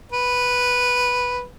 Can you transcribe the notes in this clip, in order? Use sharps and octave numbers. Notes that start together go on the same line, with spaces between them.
B4